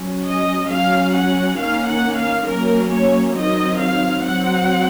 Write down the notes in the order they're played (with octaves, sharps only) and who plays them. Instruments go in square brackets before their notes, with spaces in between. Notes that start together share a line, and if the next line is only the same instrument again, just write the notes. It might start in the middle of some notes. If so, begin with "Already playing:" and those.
Already playing: [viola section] F#3 C#4
D#5
F#3 C#4 F5
F#5
D#3 A#3 C#4 F5
F#5
F5
F#3 A#3 C#4 A#4
C#5
D#3 F#3 C4 D#5
F5
F#3 C4 F#5